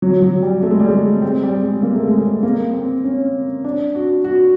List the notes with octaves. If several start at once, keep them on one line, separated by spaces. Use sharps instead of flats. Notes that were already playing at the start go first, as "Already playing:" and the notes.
F#3
F#3
G3
A3
G#3
G3
G#3
C4
G3
G#3
A#3
A3
G#3
A3
A#3
C4
C#4
D4
F#4
F#4